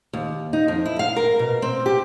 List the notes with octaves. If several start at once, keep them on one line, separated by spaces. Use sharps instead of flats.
D#2
D#4
F2
E4
F5
A#4
B2
C4
G4